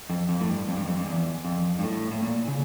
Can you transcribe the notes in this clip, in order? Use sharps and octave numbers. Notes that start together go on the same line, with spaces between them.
F2
F2
A2
G2
F2
G2
F2
F2
E2
F2
G2
A2
A2
A#2
C#3